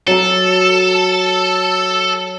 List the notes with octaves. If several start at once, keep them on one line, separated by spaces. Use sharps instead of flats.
F#3 A4 A5